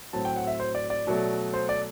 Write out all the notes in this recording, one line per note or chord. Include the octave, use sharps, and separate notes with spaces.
A2 F#3 C4 A5
G5
F#5
E5
C5
D5
D5
B2 F#3 A3
C5
D5